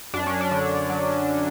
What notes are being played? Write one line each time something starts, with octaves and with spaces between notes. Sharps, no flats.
F#2 D4
C#4
D4
D3
F#3